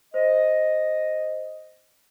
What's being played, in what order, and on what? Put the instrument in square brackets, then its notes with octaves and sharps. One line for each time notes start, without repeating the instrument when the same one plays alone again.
[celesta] C5 [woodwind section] D#5